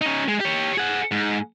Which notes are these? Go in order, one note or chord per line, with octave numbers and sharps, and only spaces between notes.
C#4 D#4
G#3
G4 C#5
G#4 F#5
G#2